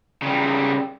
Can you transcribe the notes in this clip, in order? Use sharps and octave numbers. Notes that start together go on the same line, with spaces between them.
C#3 G3